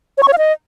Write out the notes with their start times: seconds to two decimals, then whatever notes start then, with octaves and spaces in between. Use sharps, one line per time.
0.18 C#5
0.23 C#6
0.28 C#5
0.33 F5
0.38 D#5